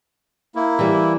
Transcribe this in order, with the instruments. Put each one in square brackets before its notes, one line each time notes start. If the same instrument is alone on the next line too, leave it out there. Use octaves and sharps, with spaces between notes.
[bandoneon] A#3 E4
[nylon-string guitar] E3 G3